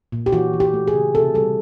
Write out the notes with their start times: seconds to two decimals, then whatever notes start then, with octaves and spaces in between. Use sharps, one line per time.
0.12 A#2
0.26 G4
0.32 E3 F#4
0.53 E3
0.60 G4
0.74 A3
0.88 G#4
0.94 C#3
1.15 C3 A4
1.34 G3 A4